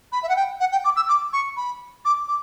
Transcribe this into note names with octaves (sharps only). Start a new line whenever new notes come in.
B5
E5
F#5
G5
F#5
G5
D6
E6
D6
C#6
B5
D6
D6